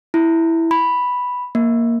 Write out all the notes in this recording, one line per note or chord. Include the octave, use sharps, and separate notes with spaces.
E4
B5
A#3